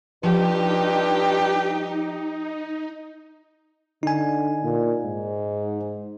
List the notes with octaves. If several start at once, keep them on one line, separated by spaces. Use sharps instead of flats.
G2 F3 D#4 G4
D3 D#4 G#5
A#2
G#2